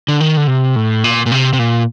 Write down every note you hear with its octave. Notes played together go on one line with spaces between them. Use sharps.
D3
D#3
D3
C3
A2
A#2
A#2
C3
C3
A#2